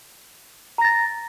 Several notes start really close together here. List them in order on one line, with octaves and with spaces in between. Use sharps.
A#5 A#6 A6